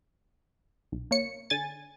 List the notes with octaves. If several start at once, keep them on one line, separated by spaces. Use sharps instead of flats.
B1
A#3 C#5 C#7
D3 G#5 A6